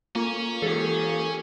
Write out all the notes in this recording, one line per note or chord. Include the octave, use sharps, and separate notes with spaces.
A#3 C#4 F4
E3 G4 A4